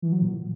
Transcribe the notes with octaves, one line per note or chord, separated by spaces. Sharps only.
E3
F#3
A#2